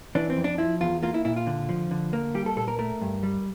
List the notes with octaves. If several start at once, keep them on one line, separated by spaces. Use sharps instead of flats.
E3 D4
C4
F2
D4
F3 E4
E2 F4
A#3 F4
E4
A#2 E4
F4
D3
F3
D3
A#3
G3 G4
A4
A#2 A4
A#4
A3 A#4
G2
G3